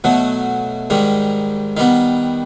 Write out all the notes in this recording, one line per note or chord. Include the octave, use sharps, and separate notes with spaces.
B2 F#3 A3
G#2 D#3 G3
D#3 G3 B3